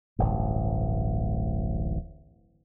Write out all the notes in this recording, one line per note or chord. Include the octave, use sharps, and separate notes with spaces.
D1 A1 G2